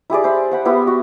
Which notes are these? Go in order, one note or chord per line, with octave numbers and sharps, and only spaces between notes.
E4 G4 G#4 D5
E4 C5
C5 F#5 B5
B3 E4 G4
F#4